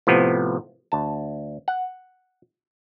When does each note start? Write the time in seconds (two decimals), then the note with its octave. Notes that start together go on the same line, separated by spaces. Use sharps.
0.07 A2 C3 F3 B3
0.92 D2 A5
1.68 F#5